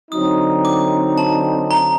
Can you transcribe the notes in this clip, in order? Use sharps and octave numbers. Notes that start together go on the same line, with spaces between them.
D3 F#3 C4 D#4 D#6
D6
A5
A#5